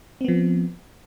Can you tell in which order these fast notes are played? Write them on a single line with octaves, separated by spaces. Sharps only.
C4 B3 F3